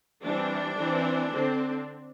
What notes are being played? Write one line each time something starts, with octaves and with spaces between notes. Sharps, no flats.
E3 G3 C4 D4
E3 C4
D3 C4